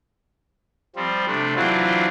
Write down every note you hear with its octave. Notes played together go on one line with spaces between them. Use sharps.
F3 G3 C4
C3 A3 D4
E3 F#3 C4 D4 E4 F4